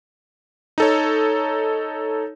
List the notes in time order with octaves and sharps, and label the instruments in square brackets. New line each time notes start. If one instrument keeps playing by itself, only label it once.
[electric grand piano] D#4 A4 C#5